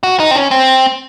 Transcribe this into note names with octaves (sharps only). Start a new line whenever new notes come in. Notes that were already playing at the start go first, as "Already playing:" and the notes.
F#4
D#4
C4
C#4
C4